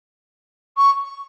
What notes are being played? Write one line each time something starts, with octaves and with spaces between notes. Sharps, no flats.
C#6